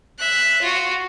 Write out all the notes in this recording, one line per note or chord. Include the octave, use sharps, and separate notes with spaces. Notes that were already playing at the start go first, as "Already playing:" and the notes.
E5 F#6
F4 F#4